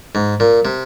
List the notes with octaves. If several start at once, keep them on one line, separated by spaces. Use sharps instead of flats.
G#2
A#2
C3